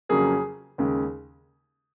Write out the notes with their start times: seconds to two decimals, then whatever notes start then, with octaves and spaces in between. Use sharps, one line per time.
0.09 F2 C#3 F#3 A#3 G#4
0.78 D#2 C#3 G#3